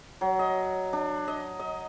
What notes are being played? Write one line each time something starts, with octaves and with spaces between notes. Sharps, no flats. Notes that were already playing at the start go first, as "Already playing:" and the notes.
F#3
D#5
D4
D#5
D#5